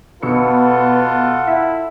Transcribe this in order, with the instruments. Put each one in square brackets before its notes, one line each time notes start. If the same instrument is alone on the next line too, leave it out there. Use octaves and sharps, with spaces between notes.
[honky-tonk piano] B2 E6 C#7 [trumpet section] F4 A4 F#5 [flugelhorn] B4
[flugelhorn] E4 [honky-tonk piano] E5